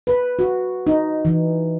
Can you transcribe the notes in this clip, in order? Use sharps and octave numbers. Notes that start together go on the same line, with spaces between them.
B4
F#4
D#4
E3